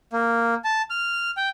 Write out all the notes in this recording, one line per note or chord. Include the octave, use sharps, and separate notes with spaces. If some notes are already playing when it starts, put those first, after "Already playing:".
A#3
A5
F6
G5